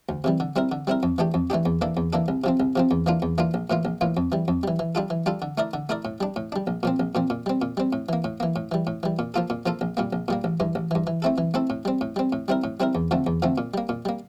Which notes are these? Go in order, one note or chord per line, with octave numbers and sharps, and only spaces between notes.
D2
C3 E3 G3
D3
G3 C4 E4 A#4
D3
G3 C4 E4 A#4
F2
E3 A3 D4 G4
F2
E3 A3 D4 G4
E2
E3 A#3 D4 A4
E2
E3 A#3 D4 A4
C2
C3 F3 C4
C2
C3 F3 C4
E2
E3 A#3 D4 F4
E2
E3 A#3 D4 F4
A#1
A2 E3 A#3 F4
A#1
A2 E3 A#3 F4
F2
E3 G3
F2
E3 G3
E3
G3 D4 F4 A4
E3
G3 D4 F4 A4
D3
A3 E4 A#4 D5
D3
A3 E4 A#4 D5
A2
G3 D4
A2
G3 D4
A#1
A#2 F3 C4
A#1
A#2 F3 C4
A#2
G3 C4
A#2
G3 C4
A2
E3 A#3
A2
E3 A#3
A2
E3 G3
A2
E3 G3
A#2
F3 A#3 F4 A4
A#2
F3 A#3 F4 A4
A#1
A#2 G3 A#3
A#1
A#2 G3 A#3
A1
G2 E3
A1
G2 E3
E3
A3 C4 E4 A4
E3
A3 C4 E4 A4
A2
G3 C4
A2
G3 C4
A2
G3 C4 E4 A#4
A2
G3 C4 E4 A#4
E2
D3 F3 A3 C4
E2
D3 F3 A3 C4
A#2
G3 A#3
A#2
G3 A#3